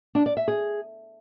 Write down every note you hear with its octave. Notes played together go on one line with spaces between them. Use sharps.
D4
D5
E5
G#4